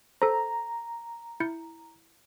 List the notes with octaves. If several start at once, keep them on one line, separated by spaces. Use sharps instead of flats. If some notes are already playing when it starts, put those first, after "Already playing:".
A4 C5 A#5
E4 G6 C#7